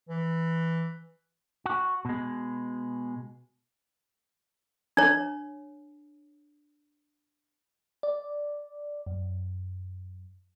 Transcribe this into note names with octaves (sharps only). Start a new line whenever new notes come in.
E3
F#4
B2 G#3
D4 C#5
D5
F#2